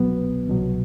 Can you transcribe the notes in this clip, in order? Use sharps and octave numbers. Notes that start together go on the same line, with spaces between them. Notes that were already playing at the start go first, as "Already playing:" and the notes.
Already playing: C2 B2 F#3 B3
C2 B2 F#3